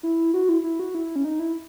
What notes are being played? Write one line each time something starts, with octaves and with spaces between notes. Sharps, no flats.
E4
F#4
E4
E4
F#4
E4
C#4
D#4
E4